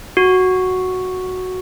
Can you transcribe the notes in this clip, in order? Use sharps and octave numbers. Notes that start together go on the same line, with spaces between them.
F#4